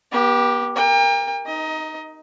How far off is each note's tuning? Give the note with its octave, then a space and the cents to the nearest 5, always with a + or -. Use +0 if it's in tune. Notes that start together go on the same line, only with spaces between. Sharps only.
B3 -40 G4 +0
A#4 +0 G5 +40
D#4 +0 D#5 +25